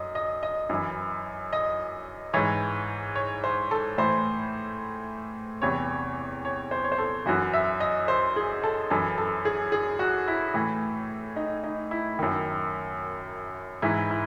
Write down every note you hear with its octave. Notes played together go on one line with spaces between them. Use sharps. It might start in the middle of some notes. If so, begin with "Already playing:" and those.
Already playing: F#2 D#5
D#5
D#5
F#2 E3
D#5
G#2 E3 C#5
C#5
C5
A4
A2 E3 C5
E2 C3 E3 C#5
C#5
C5
C#5
C5
A4
F#2 E3 F#4
E5
D#5
C5
G#4
A4
F#2 E3 A4
A4
G#4
G#4
F#4
E4
A2 E3
D#4
D#4
E4
F#2 D#3
G#2 E3 E4
E4